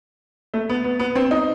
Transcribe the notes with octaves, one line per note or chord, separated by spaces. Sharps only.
A3
B3
B3
B3
C4
D#4